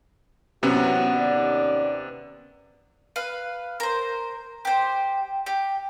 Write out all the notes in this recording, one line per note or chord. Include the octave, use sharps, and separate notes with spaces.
C3 E3 F#3 B3 C#4 F#4 F#5
D#2 D5
B4 F5
A#4 C5
G4 C5
G4